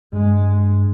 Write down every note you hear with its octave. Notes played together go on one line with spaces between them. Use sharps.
G2 G#3